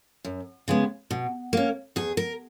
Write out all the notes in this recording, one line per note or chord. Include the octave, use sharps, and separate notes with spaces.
F#2
C#3 G#3 B3
B2
A#3 C#4
E2 G#4
A#4